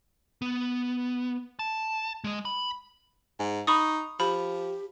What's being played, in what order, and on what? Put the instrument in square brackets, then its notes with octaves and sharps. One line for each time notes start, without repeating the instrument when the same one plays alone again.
[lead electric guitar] B3
A5
G#3 D#5
B5
[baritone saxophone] G#2
[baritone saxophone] D#4 [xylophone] B5 C#6 D#6
[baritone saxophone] F3 [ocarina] G4 [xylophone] B5